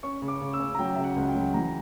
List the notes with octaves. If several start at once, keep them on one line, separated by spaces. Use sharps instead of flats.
C#4 C#6
C#3
D6
C#3
E6
C#4
A#5
F#3 G5
C#3 E5
F#5
C#2
G5
F#3
E3 A#5